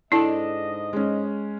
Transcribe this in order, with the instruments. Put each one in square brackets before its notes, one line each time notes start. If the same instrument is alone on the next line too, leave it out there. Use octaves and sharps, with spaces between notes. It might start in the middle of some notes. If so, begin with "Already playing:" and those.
[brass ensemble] G#2 D#5 [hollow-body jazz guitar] D4 A4 [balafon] E4
[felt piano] G#3 C#4